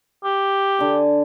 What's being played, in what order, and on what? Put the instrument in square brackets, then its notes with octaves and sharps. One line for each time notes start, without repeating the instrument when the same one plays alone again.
[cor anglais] G4
[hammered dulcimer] D3 G#5